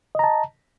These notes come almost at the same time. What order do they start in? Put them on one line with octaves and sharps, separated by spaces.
D#5 A#5 A5